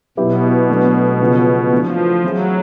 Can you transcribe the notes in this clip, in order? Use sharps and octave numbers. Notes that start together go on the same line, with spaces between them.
B2 F#3 B3 E4 G4
F#3 A3 D4
C#3 F3 A3
E3 F3 A3 D4
E3 F#3 A3 C4 E4 G#4